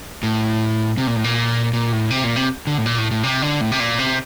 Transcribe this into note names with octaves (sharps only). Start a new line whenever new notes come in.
A2
C3
A#2
A2
A#2
A#2
A2
C3
A#2
C3
D3
A2
A#2
A2
A2
C3
D3
A2
C3
A#2
C3